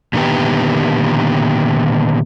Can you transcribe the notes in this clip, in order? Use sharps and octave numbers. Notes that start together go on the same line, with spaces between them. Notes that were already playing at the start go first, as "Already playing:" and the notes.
A#2 D3 D#3 B3 G4